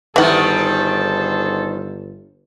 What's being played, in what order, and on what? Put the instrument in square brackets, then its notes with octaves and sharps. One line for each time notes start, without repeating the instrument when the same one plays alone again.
[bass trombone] G1 [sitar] D#3 G3 [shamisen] E3 F#5 [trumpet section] G#4 A4 C5